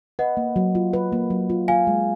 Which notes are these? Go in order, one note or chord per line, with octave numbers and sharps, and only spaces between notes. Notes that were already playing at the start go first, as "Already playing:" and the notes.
B4 D#5 F#5
A#3
F#3
F4
B4
A#3
F#3
F4
F4 F5 G#5
G#3